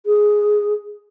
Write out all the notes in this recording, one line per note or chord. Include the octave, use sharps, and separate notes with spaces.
G#4